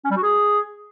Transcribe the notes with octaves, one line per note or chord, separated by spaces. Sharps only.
C#4
G3
F#4
G#4